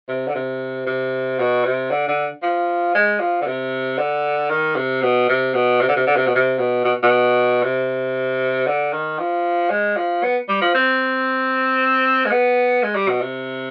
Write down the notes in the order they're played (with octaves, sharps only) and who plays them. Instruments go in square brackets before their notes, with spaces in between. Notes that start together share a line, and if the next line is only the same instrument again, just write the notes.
[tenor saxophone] C3
D3
C3
C3
B2
C3
D3
D3
F3
G#3
F3
D3
C3
D3
D#3
C3
B2
C3
B2
C3
D3
C3
D3
C3
B2
C3
B2
B2
B2
C3
D3
D#3
F3
G#3
F3
B3
G3
F3
C4
G#3
B3
G#3
G3
B2
C3